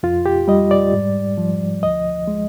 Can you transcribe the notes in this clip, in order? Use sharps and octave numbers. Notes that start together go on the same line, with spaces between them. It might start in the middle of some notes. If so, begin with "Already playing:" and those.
F2 F4
G4
G3 D#5
D5
G#2
F3
D2 D#5
G#3